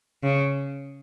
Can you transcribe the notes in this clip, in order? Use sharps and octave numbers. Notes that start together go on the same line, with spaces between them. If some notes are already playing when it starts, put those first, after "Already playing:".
C#3